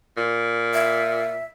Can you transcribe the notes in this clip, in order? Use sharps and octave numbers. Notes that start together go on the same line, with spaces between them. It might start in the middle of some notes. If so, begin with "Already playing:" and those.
A#2
E5